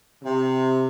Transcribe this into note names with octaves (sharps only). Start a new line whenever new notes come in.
C3